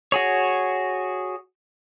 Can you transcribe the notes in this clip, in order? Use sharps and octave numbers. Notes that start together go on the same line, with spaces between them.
F#4 G#4 C#5